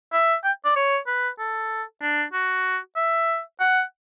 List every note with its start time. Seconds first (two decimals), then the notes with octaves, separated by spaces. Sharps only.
0.13 E5
0.44 G5
0.65 D5
0.76 C#5
1.07 B4
1.39 A4
2.01 D4
2.33 F#4
2.96 E5
3.60 F#5